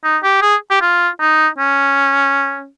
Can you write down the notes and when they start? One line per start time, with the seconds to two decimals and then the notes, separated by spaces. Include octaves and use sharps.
0.04 D#4
0.23 G4
0.42 G#4
0.71 G4
0.82 F4
1.21 D#4
1.59 C#4